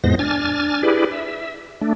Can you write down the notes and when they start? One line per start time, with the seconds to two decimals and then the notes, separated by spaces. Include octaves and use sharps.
0.04 F2 A2 G#3 B3 C5 A#6
0.19 D4 G#5 F6 A6
0.83 E4 G4 G#4 B4 D5
1.12 E5
1.81 A3 D4